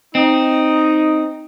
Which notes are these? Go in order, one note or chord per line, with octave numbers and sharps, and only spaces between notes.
C4 D#4